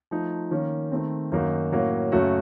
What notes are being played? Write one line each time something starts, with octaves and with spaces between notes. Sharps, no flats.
F3 A3 D#4
D#3 A#3 C#4
D#3 A3 C4
F#2 D#3 A#3 D#4 F#4
A2 F#3 A#3 C#4 F#4
F#2 C#3 A3 C#4 F#4